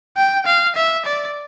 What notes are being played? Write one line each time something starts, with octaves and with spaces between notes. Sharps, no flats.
G5
F5
E5
D5